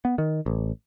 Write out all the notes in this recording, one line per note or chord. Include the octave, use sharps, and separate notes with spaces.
B3
D#3
A1